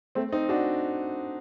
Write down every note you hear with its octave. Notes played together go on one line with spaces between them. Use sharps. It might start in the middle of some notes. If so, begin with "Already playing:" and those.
A3 C4
C4 D#4
D4 F#4